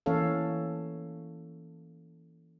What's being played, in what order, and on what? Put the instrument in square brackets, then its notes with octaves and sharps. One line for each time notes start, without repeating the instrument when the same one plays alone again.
[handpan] E3 A#3 C#4 A4 C#5 F5